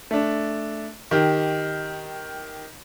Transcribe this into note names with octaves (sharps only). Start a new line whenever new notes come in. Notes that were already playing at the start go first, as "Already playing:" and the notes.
A3 D4
D#3 G4